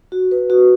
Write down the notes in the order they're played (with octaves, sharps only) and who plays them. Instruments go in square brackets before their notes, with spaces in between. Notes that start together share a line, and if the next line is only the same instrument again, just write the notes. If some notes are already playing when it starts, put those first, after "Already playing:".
[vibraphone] F#4
B4
F#4